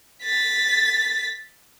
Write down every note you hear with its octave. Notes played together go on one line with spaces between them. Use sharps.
A6 B6